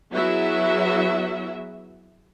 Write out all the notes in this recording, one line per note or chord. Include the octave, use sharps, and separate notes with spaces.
F#3 B3 E4 F#4 G#4 E5